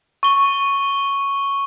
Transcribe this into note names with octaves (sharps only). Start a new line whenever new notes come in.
C#6 G7